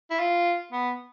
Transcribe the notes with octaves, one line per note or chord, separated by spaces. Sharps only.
E4
F4
B3